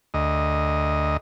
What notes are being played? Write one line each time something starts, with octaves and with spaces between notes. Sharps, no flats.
D2 D#5